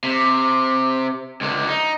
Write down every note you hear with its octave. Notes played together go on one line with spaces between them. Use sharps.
C3
C#2 D3
D#4